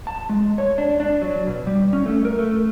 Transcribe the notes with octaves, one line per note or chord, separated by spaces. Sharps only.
A5
G#3
C#5
D4
D4
F#3
B2
G3
C#4
A3
A#4
A3